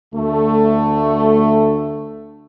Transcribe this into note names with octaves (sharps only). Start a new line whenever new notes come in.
D2 A3